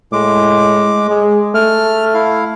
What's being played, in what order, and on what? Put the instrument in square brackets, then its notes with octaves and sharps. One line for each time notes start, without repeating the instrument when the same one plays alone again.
[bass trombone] A2 [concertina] G#3 D6
[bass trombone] G#3
[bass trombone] A3 [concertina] F6
[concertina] E4 F5